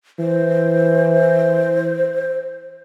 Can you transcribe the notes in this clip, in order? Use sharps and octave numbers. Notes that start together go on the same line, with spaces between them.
E3 C5